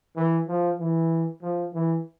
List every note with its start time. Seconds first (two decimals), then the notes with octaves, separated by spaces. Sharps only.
0.16 E3
0.48 F3
0.79 E3
1.42 F3
1.74 E3